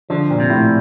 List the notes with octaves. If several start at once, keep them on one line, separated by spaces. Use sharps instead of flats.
D3 F3
A#2
C3
A2